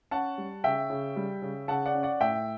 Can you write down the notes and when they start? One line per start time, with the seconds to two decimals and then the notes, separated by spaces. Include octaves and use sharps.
0.11 C#4 F#5 A5
0.38 G3
0.64 C#3 E5 G5
0.90 C#3
1.16 G3
1.42 C#3
1.68 C#3 F#5 A5
1.86 D5 F#5
1.95 C#4
2.03 D5 F#5
2.20 A2 E5 G5